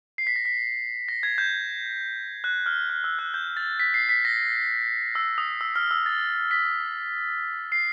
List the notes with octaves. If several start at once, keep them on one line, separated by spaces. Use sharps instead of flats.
C7
B6
A#6
B6
A#6
G#6
G6
F#6
F6
F6
E6
F#6
G6
A6
B6
C7
B6
A#6
E6
D#6
E6
F6
E6
A6
B6
C7